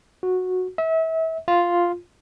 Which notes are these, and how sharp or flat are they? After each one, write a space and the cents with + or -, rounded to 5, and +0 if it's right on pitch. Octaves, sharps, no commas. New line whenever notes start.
F#4 -10
E5 -30
F4 +0